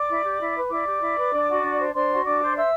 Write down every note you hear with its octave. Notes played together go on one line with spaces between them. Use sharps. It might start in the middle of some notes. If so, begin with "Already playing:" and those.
Already playing: D5 D6
E4
G4
E4
B4
E4 D5 D6
G4
E4
B4
D4
F#4
D4
C5
D4 C5 C6
F#4
D4 D5 D6
C5
C5 E5 E6